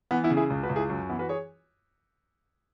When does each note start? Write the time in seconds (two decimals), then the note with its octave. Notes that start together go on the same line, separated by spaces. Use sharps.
0.11 E3 B3
0.24 B3 E4
0.30 C#3
0.37 E4 G#4
0.50 C#2
0.63 F#4 B4
0.69 C#2
0.76 E4 G#4
0.89 F#2
1.10 E3 B3 E4
1.19 F#4 B4
1.29 G#4 C#5